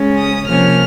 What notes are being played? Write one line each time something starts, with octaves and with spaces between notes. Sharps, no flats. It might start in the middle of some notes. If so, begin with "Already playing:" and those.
Already playing: C#3 G#3 C#4
D#6
C3 F3 A#3 C#4 F6